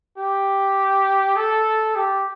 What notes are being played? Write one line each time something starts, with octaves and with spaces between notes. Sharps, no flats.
G4
A4
G4